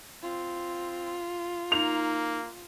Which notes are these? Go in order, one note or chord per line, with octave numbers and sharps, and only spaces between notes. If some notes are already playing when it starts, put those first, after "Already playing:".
C4 F4
A#3 D#4 F7